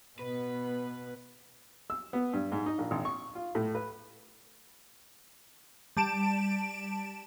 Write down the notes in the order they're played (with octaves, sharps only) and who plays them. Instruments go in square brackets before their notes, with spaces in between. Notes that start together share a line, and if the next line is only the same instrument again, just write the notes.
[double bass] B2 [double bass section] B3 [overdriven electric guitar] B4
[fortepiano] E6
B3
G2
G#2
D#4
A#1
G#1
C#6
F4
A2
B4
[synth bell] G3 A5 D7 E7